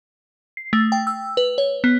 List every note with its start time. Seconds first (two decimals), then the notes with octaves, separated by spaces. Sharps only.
0.57 C7
0.73 A3
0.92 G5
1.07 E6
1.37 B4
1.58 C#5
1.84 B3